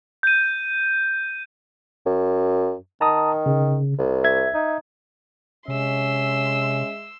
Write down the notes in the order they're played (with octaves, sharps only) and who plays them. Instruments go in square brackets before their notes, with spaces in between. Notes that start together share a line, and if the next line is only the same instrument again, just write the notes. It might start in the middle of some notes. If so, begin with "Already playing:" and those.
[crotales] G6 D#7
[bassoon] F#2
[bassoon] D#3 [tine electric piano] A5 A#5 D#6
[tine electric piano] C#3
[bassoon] C2
[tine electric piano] E5 G#6
[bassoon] D#4
[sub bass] C3 [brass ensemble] G#3 E5 [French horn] C#4 [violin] C6 E6